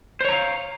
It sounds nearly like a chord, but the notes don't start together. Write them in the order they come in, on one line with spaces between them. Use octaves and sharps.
C5 C#5 A#5 F5